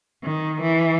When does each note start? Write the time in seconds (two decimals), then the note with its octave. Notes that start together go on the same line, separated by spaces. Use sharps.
0.22 D#3
0.62 E3